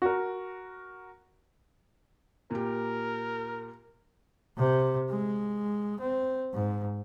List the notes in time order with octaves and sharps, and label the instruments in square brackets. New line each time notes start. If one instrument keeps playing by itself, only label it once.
[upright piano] F#4 A#4
[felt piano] A#2 G4 [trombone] A#4
[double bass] C3
G#3
C4
G#2